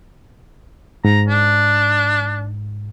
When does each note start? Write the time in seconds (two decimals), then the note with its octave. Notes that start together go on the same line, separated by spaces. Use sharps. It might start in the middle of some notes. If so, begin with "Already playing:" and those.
1.05 G#2 A#5
1.28 D4